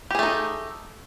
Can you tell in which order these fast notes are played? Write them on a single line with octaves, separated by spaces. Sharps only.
G4 G#4 A3 D#4